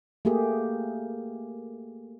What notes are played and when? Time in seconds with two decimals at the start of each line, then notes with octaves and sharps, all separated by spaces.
0.25 A3 A#3 G4 G#4